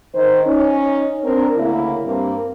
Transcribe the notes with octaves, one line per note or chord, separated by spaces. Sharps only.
D#3 C5
C#4 D#4
C4 D4 A#4
D2 C#3 A#3 E4
G2 A#3 C4